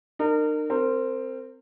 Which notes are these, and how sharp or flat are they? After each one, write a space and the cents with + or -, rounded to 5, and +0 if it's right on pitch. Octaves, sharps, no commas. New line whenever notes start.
D#4 -45 A#4 -25
C4 +0 A#4 -25